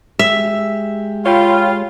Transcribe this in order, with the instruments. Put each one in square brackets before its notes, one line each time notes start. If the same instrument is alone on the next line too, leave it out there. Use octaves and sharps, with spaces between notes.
[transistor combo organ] G#3 G4 [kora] E5
[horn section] F4 [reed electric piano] C#5 G5 B5